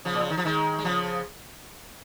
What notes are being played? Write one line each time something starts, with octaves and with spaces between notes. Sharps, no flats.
C#3 F3
A#2
C#3
D#3
F3
D#3 G#3
G#3
C#3 F3